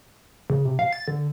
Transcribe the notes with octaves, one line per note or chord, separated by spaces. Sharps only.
C#3
C3
F5
A6
D3